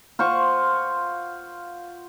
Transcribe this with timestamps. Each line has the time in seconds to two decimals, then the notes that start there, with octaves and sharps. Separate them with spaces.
0.19 F4 C5 F#5 C#6